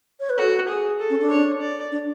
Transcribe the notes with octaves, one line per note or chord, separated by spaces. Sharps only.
C#5
B4
F#4 A4
G#4
A4
C#4
D4
C#5
D5
D4